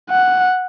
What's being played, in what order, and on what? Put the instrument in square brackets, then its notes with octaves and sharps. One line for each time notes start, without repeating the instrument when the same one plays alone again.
[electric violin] F#5